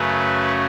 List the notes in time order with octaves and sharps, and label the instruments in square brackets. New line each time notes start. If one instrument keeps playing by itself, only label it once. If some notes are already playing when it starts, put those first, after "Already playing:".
Already playing: [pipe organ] F#2 C#3 F#3 A3 C#4 B4